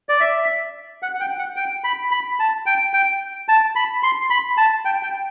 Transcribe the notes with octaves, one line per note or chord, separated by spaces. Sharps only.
D5
E5
F#5
F#5
G5
F#5
G5
B5
B5
A5
G5
G5
A5
B5
C6
B5
A5
G5
G5